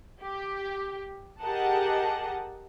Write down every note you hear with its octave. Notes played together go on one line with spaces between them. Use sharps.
G4
G4 G#4 A#4 D#5 F#5 A5